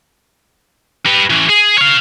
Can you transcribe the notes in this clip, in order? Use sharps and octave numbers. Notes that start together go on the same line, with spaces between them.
G4 B4
E3 C#4
G#4
C#5 F5